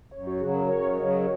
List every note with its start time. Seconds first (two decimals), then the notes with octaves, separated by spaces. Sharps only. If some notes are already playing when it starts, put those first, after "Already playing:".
0.11 F#2 C#5
0.27 F#4
0.40 C#3 F#3 G#4
0.54 A#4
0.69 F#2 C#5
0.97 C#3 F#3 D#5